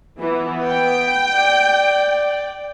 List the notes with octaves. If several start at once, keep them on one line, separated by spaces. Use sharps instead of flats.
E3 B3
G5
D5